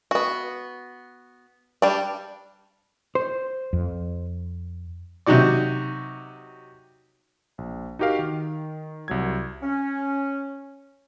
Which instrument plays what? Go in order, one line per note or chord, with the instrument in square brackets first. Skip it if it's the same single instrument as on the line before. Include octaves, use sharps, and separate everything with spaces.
[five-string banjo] B3 F#4
G3 D4
[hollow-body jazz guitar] C5
[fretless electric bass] F2
[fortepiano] C3 F#3 D#4 F#4 D5
[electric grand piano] A#1
D#4 F#4 G4 A#4 F5
D#3
C2 F#3 G#6
[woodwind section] C#4